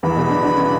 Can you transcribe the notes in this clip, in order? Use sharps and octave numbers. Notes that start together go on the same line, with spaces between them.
E2 E3 B5
B2 B3
D3 D4
D3 D4
C#3 C#4